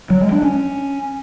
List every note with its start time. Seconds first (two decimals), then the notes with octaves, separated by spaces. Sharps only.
0.10 F#3
0.21 G#3
0.32 D4
0.43 C#4